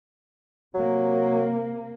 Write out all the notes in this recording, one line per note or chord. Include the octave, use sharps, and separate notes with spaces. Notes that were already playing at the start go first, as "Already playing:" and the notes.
C3 F#3 A#3